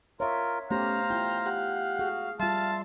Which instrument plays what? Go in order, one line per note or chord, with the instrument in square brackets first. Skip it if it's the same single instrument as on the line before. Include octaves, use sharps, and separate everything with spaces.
[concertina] F4 A#4 [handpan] C#5 E5
[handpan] A3 B3 G4 [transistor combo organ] C#4 [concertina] C5 A#5 [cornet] F5
[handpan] E4 F4 [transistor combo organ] G5
[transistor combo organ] G4 F#5
[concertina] F#4 [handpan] G#4
[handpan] G3 F4 [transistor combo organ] E5 C6 [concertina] F5 [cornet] A5